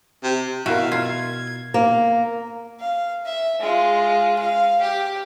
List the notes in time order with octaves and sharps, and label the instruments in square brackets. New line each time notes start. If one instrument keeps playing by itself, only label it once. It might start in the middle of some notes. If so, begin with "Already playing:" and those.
[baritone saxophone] C3
[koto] B2 [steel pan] E4 A#4 [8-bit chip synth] E5 F5
[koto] F4 [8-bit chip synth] G#6
[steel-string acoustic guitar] A#3
[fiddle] F5
E5
G#3 F4
F5
G4